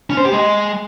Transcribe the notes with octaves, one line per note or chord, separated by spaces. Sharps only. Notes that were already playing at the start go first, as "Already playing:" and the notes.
C#4
C5
G4
G#3